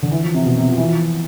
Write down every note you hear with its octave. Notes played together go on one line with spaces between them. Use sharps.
D3
E3
F3
C3
B2
C3
F3
E3
F3